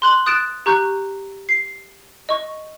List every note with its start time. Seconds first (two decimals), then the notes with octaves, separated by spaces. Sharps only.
0.02 C6 F#6 F#7 G7
0.26 D#6 F#6 A6 D7 E7
0.66 G4 A#5 C#6 F#6 G6
1.49 C7
2.29 D#5 C#6